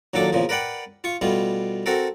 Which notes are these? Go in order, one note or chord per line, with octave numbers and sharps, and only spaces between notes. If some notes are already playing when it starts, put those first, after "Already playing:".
D#2 A#2 F#3 D4 A4 D6
E2 A#2 C#3 F3
A#4 B4 D5 F#5 G5
F4 C#6
B2 G3 A3 F4
C4 F#4 A4 A#4